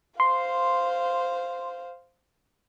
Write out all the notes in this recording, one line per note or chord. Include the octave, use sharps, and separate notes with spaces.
C5 F5 C6